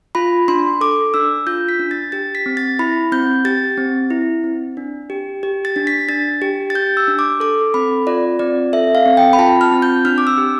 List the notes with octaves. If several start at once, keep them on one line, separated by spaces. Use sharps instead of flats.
F4 B5
D4 C6
A4 D6
D4 E6
F4 G6
B6
D4
A6
G4 A6
B6
C4
A6
E4 B5
C4 G6
G4 A6
C4
E4
C4
D4
G4
G4
A6
D4
B6
D4 A6
G4
A6
G4 G6
E6
D4
D6
A4 D6
C4 B5
F4 D5
C4 D5
A4 E5
F5
C4
G5
B5
F4 A5
F6
C4
G6
D4 F6
D6
E6
G4